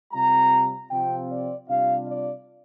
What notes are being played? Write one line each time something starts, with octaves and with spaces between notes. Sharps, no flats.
C3 G3 C4 F4 A#5
C3 F3 C4 F4 G5
D5
C3 G3 D4 F4 F5
D5